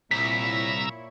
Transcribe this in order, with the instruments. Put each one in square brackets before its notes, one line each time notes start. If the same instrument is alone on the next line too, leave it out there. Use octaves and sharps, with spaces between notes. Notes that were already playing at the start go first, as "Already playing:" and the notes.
[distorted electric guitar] C2 [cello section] A#2 E4 C#5 [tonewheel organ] A#5 E6 [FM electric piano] B6